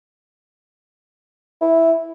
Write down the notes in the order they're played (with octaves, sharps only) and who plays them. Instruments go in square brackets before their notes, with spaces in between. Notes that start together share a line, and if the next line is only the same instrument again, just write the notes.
[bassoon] E4